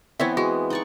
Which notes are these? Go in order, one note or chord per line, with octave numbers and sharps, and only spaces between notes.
E3 B3 C4 C#5 E5
G#3 F#4
D#4 D5 C#6